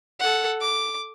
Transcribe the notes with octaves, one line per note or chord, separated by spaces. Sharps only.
A4 F#5
D6